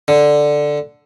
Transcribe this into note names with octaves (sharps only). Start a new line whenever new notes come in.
D3